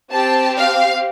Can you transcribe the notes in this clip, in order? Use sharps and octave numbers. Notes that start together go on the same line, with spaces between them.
C4 G4 A5
F5